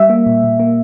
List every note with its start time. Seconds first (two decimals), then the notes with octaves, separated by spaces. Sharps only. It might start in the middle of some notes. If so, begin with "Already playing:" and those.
Already playing: G3 E5
0.10 A#3
0.26 A#2
0.44 A#2
0.59 A#3